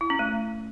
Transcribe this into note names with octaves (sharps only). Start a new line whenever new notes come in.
E4
C#4
A3